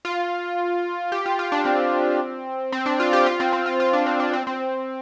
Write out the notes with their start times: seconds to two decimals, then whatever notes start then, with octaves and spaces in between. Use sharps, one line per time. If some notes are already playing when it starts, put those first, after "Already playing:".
0.05 F4
1.12 G4
1.26 F4
1.39 F4
1.52 D4
1.65 C4
2.72 C4
2.86 D4
3.00 F4
3.13 G4
3.26 F4
3.40 C4
3.53 C4
3.66 F4
3.80 F4
3.93 D4
4.06 C4
4.20 D4
4.33 C4
4.47 C4